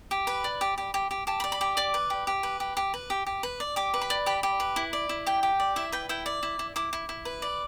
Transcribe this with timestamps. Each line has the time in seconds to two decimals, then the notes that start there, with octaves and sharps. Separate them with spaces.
0.11 G4
0.27 B4 B5
0.44 D5
0.61 G4
0.78 G4
0.94 G4
1.11 G4
1.27 G4 A5
1.40 B5
1.44 D5
1.52 B5
1.61 G4
1.77 D5 D6
1.94 B4
2.10 G4
2.27 G4
2.43 B4
2.60 G4
2.77 G4
2.94 B4
3.10 G4
3.26 G4
3.43 B4
3.60 D5
3.76 G4 D6
3.94 B4
4.01 B5
4.10 D5
4.26 G4 B5
4.43 G4
4.60 B4
4.76 E4
4.93 D5
5.09 E4
5.26 G4 G5
5.43 G4
5.60 D5
5.76 E4 E5
5.92 B4 G5
6.09 E4 G5
6.26 D5
6.43 E4
6.59 E4
6.76 E4 D6
6.93 E4
7.09 E4
7.25 B4
7.42 D5